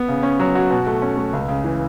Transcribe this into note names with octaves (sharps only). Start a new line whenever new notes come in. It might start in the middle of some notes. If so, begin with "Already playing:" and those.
Already playing: B3
C#3
C#4
F#3
F#4
B2
A3
C#4
A3
C#2
C#3
E3